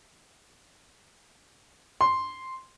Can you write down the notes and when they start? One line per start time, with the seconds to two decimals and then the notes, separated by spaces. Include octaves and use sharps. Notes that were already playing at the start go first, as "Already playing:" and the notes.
2.01 C6